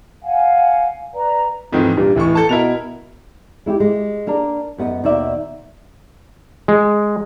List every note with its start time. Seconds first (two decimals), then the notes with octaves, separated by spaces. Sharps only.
0.23 F5 F#5 G#5
1.15 B4 D5 A#5
1.73 F2 G#2 D#3 E3
1.97 G2 A#2
2.15 F1 A2 E3 C#6
2.35 A4 A5
2.49 B2 E4 A#4 F7
3.66 G#3 E4 F#4 G4
3.80 G#3
4.27 A#3 D4 A#4
4.78 F#2 B3 B4 D#5
5.04 D#2 B2 D#4 B4 D5 E5
6.68 G#3